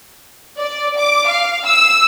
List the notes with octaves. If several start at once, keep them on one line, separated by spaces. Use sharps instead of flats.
D5
D6
F5
E6